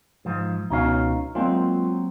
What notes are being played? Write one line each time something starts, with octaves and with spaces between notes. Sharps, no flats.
G#2 F3
C#2 B2 C#4 D#4 C#5 F5
F#3 G#3 A#3 C4 F4